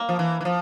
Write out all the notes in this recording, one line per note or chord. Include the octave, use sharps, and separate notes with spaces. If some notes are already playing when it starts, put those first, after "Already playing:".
Already playing: A#3
F3
E3
E3
F3